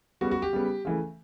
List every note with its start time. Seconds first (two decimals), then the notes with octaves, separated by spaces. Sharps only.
0.21 C#3 G3 B3 F#4
0.31 F#4
0.42 G4
0.53 C#3 G3 B3
0.85 C#3 E3 A3